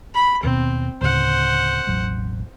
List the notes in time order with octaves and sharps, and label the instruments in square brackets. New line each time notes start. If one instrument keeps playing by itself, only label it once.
[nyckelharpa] B5
[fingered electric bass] D#2 B2 [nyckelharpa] C4
[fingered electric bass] D2 A2 C#3 [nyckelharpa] C5 F#5
[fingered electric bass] E1 A1 F#3